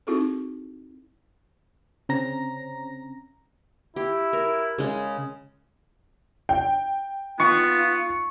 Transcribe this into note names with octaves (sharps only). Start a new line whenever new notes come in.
C4 D#4 E4 F#4 G#4 A4
C#3 C4 C#4 A#5 A#6
E4 G4
A#4
C#3 G#3
G5
B3 F4 C#6